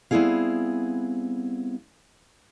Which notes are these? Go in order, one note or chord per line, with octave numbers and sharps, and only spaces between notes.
G3 B3 C4 E4 G#4 F5